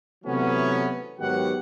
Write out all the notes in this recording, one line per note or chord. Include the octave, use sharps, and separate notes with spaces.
C3 E3 F#3 A3 B3 C#4
G#2 D#3 F#3 B3 G4 F#5